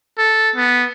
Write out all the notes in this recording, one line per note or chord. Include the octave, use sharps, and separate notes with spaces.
A4
B3